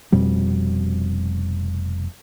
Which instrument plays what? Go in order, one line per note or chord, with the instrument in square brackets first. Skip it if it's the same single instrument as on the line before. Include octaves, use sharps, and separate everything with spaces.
[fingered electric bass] F1 F2 B2 G3